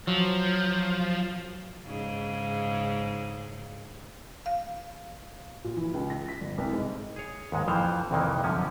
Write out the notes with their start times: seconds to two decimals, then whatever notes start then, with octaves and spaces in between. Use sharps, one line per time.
0.07 F3 F#3
1.86 G#2 C#3
4.46 F5
5.64 A#2
5.77 E3
5.94 C#2
6.10 A#6
6.28 B6
6.41 G1
6.58 C2
6.73 G#2
7.16 G#4 C#5
7.52 D#2 G#2 G#3
7.68 F2 E3 F3 C5 A#5
8.11 C2 F2 C3 D#3 E3 A#3
8.44 F#2 D3 F3 C#4